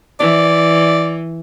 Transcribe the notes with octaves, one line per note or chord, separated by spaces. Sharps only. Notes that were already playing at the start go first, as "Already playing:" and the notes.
E3 D5